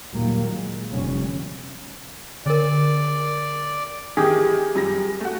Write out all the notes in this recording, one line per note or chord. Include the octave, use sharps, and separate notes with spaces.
D#2 A#2 D#3 F#3 G3 A#3
G#3
F1 B2 D3 G3 C#4
D3 A#4 D5
D#3 E3 G4 G#4
F#2 G3 A#6
A3 F#4